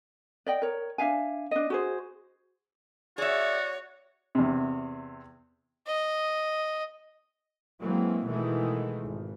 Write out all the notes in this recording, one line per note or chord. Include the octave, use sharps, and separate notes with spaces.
D5 D#5 G5
A#4 C#5
D4 E5 F5 G#5
D4 D#5
F#4 G#4 C5
F#4 G#4 C#5 D5 E5
E2 C3
D#5
E3 F#3 G#3 A#3 C4
B2 D#3 E3 G#3 A3
G#1